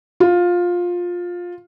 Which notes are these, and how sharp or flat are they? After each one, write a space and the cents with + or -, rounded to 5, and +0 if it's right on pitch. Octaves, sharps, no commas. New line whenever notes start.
F4 +15